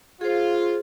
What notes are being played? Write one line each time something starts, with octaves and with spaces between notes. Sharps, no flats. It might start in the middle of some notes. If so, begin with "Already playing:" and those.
F4 G#4 C5